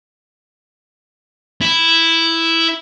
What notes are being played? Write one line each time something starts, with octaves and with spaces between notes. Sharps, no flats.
E4